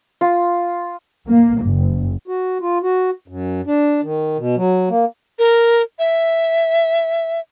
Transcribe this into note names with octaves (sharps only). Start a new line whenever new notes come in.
F4
A#3
F#1
F#4
F4
F#4
F#2
D4
D#3
B2
F#3
A#3
A#4
E5